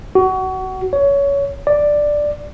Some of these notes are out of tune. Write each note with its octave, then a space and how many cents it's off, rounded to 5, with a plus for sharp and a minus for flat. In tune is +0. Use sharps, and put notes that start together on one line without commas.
F#4 +25
C#5 +20
D5 +5